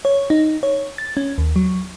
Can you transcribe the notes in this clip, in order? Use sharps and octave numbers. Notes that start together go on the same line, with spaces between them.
C#5
D#4
C#5
A6
C#4
D#2
F#3